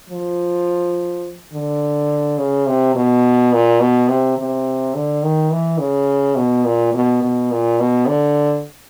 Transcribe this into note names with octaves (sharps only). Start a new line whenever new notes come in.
F3
D3
C#3
C3
B2
A#2
B2
C3
C3
D3
D#3
E3
C#3
B2
A#2
B2
B2
A#2
B2
D3